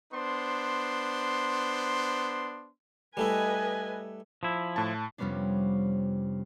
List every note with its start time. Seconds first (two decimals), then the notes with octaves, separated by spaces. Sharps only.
0.12 B3 D4 C5 C6
3.17 G3 A3 E4 B4 D#5 G#5
4.43 F3 E4
4.76 A2 A5
5.18 F2 C3 G3 B3 C#4 D4